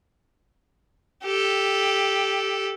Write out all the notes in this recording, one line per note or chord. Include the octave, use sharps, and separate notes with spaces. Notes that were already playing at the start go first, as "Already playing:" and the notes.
G4 A4